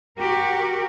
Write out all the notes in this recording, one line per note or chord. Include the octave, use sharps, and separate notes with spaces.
F#4 G4 A#4